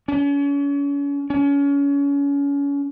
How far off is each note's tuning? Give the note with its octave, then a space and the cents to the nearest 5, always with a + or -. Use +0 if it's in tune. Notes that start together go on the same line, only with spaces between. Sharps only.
C#4 +35
C#4 +30